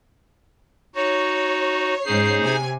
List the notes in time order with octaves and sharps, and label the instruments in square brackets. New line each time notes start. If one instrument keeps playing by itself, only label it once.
[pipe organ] D#4 F#4 [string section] C#5
[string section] G#2 C#4 C7 [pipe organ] D#4 G#4 C5
[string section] C3 G#5